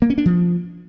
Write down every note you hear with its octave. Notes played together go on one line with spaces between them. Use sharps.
A#3
C#4
D4
F3